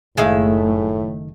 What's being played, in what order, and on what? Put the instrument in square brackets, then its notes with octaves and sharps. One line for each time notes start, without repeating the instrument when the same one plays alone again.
[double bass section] F#1 A3 [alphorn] A2 [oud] D#3 G#4 F5 [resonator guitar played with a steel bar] G#3 E5